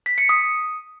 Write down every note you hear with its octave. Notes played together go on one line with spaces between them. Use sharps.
B6
C#7
D#6